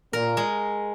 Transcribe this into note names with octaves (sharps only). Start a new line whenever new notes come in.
A#2 A#4
G#3